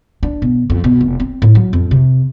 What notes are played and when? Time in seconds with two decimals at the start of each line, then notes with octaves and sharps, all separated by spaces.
0.23 D4
0.42 B2
0.70 F2
0.84 B2
1.01 F1
1.20 C4
1.42 A2
1.55 F#3
1.73 F2
1.91 C3